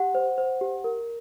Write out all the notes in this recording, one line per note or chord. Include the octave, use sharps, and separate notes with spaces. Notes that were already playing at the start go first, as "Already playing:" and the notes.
Already playing: G4 F#5
C5
C5
G4
A#4